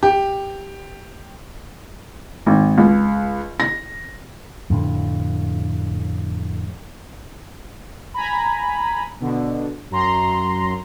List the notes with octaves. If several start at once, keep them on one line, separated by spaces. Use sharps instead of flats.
G4
G#1
C#2
A#6
F2 A2 D3
G#5 A#5 B5
B2 D3
F#2 A#5 C6